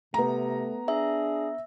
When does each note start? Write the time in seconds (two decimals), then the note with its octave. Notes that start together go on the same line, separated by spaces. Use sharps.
0.14 C3 A3 B3 A#5
0.88 D4 G#4 E5